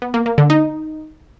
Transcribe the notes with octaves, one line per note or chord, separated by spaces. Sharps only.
B3
A#3
A#3
D3
D#4